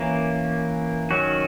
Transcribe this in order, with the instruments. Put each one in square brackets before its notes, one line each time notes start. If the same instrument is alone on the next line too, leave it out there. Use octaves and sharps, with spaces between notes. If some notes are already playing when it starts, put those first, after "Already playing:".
Already playing: [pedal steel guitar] E3 A#3 C#4
D#3 F#3 C#4 F#4